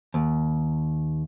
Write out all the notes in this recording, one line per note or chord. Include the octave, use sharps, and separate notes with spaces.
D#2